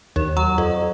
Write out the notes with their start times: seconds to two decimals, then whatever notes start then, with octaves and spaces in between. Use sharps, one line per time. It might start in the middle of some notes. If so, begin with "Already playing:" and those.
0.16 D#2
0.37 F#3
0.58 F2